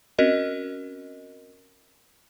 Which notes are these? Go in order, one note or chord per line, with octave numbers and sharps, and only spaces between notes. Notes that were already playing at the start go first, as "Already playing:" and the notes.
C4 C#4 F#4 A#4 D#5